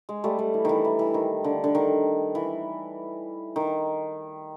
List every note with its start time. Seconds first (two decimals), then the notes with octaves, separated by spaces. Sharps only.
0.09 G#3
0.24 G3 A3
0.39 G3
0.54 E3
0.65 D#3 E3
0.85 E3
0.99 E3
1.14 D#3
1.44 D3
1.64 D3
1.75 D#3
2.35 E3
3.56 D#3